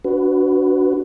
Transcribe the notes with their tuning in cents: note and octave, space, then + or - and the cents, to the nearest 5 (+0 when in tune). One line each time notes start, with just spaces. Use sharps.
D4 -20 F#4 +0 B4 +10